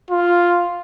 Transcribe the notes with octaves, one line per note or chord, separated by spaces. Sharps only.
F4